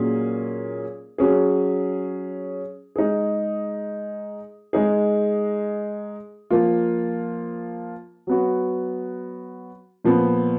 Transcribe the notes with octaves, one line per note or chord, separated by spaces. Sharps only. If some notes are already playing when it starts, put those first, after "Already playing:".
Already playing: A#2 F#3 C#4 G#4
F#3 C#4 G#4
G#3 D#4 G#4
G#3 D#4 G#4
F3 A#3 F4
F#3 B3 F#4
A#2 F3 B3